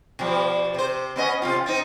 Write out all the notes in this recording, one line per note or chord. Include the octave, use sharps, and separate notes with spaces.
B2 F3 G3
C3 C5
B3 C#4 D#5
C3 C4 F4
C4 D#4